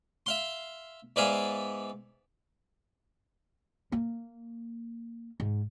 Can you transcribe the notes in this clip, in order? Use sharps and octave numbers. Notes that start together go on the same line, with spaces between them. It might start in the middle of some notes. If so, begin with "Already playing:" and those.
E5 F5 C6
G#2 B3 D5 E5 F5 G#5
A#3
G#2